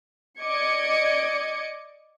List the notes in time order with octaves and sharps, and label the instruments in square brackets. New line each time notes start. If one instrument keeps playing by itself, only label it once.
[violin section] D5 D#5 D6 G#6 C#7